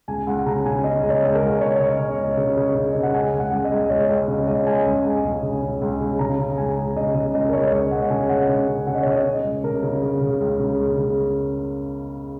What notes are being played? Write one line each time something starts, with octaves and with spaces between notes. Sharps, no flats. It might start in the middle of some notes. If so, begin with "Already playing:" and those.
C#2 G#5
C#2 F#5
C#3 A#5
C#3 G#5
C#3 D#5
C#2
C#5
C#2
A#4
C#2
C#3 C#5
C#3 D#5
C#3 D#5
C#2
C#3
C#3
C#3
C#3 D#5
F#5
C#2 G#5
C#2
F#5
C#2
D#5
C#2
C#2 C#5
C#2 D#5
C#3
C#2 D#5
C#2 G#5
C#2
C#2 G#5
C#2
C#3
C#3
C#2
C#3
C#3 A#5
C#3
C#2 G#5
C#2
C#3 D#5
C#3 D#5
C#2 D#5
A#4
C#2 C#5
C#2 D#5
C#2 F#5
C#3 G#5
C#2 F#5
C#3
C#3
C#3 F#5
D#5
C#5
C#3 D#5
C#3
C#2
C#3 A#4
C#3
C#3
C#3
C#2
C#3
C#2
C#3